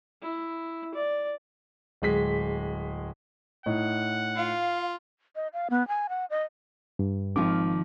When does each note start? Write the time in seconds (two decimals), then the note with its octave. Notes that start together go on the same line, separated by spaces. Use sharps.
0.22 E4
0.94 D5
2.02 D1 G#3 B6
3.66 A2 D#4 F#5
4.37 F4 F5
5.36 D#5
5.53 F5
5.70 B3
5.88 G#5
6.09 F#5
6.30 D#5
6.99 G2
7.36 G#1 D#3 F3 D6